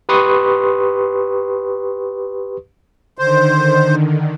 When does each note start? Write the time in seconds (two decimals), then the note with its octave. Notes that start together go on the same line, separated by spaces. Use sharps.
0.09 G4 B4 C6 C#6 D#6
3.18 D3 D#3 C5